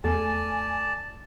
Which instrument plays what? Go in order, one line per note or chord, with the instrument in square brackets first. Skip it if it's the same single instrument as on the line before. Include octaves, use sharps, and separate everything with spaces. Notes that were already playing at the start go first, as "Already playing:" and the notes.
[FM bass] E2 [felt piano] A3 [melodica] D5 A5 [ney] G#5